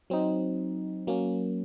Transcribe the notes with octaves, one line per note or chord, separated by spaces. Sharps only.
F#3 C4 D#4
F#3 A#3 C#4